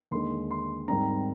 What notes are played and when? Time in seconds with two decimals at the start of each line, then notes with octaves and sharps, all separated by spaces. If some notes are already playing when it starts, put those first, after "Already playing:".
0.11 D#2 D3 G#3 C6
0.51 C6
0.88 G#2 D#3 G3 C4 A#5